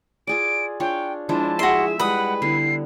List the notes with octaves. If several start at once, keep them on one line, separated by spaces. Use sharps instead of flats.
F4 G#4 D5 D7
D4 F4 C#5 G5
F3 G#3 D4 E4 A5
F#4 G#4 E5 C6
G3 G#3 B4 F#5 D#6
D3 B3 E4 C7